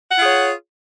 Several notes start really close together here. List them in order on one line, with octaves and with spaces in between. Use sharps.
F#5 F4 G#4 C#5